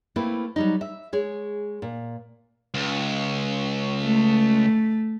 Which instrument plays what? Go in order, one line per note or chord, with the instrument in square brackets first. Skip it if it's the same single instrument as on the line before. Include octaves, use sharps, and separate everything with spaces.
[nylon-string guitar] A3 A#3 C4 E4 B4
F#3 G3 D#4
E5
G#3 G#4 C#5
A#2
[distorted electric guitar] C#2
[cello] A3